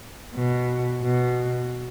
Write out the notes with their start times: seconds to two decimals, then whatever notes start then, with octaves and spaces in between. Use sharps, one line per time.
0.35 B2
1.02 B2